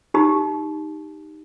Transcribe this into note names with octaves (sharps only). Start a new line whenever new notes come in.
D#4 G4 A#5